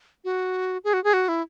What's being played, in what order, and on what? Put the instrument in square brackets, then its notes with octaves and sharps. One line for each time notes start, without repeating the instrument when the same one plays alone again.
[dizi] F#4
G#4
F#4
G#4
F#4
E4